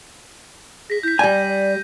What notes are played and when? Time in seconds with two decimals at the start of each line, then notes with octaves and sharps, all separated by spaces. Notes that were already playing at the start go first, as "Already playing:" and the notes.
0.90 G#4 A#6 B6
1.03 E4 G6 B6
1.19 G3 D5 G#5 D#7
1.48 D5